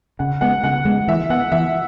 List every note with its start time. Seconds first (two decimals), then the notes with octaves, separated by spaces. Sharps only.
0.19 C#3 F#5
0.41 G#3 B3 F#5
0.63 C#3 F#5
0.85 G#3 B3
1.08 E3 E5
1.30 B3 F#5
1.52 E3 E5